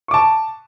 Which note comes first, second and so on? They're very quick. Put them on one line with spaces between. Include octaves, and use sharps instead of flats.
C#6 D6 A5